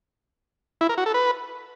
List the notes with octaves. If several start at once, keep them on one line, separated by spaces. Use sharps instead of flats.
E4
A#4
F#4
A4
B4